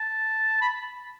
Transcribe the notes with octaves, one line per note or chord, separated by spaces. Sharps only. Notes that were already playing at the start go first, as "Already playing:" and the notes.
Already playing: A5
B5